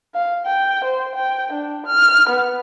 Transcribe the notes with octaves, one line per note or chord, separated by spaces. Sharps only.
F5
G5
C5
G5
D4
F6
B3